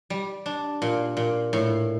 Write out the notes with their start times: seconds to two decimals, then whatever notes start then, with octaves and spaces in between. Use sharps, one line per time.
0.10 G3
0.46 D4
0.82 A#2
1.17 A#2
1.53 A2